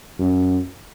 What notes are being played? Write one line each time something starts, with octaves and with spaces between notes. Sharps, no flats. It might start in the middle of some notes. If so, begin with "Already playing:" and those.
F#2